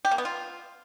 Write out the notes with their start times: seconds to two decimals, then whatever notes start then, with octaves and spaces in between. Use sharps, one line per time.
0.05 G4
0.11 A#3
0.18 B3
0.25 F4